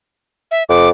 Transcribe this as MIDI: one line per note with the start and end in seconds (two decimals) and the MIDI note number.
0.51 0.63 76
0.69 0.91 41
0.69 0.89 86